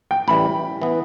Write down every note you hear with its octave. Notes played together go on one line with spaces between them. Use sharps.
G5
A1 A2 E3 G3 B5
E3 B3